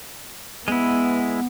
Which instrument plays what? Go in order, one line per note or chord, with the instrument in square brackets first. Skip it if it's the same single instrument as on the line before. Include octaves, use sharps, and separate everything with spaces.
[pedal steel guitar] G#3 E4 [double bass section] B3